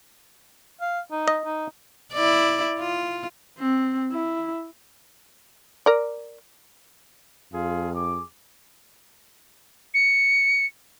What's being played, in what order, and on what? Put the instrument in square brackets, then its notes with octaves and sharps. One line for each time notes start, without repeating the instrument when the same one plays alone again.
[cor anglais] F5
D#4
[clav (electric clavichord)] D#5
[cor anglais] D#4
[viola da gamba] E4 D5
F4
[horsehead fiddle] C4
E4
[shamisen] A#4 D5
[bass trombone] F2 [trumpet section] F4 G#4 F5
[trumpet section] G#4 D6
[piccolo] C#7